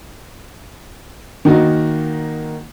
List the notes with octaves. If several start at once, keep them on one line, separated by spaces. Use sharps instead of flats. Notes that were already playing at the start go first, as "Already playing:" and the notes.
D#3 A#3 D#4 F#4